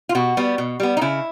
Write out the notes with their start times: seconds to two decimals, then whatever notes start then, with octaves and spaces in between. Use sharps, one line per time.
0.09 F4
0.15 B2 F#4
0.37 G3 B3
0.58 B2
0.80 G3 B3
0.97 D#4
1.01 C#3 E4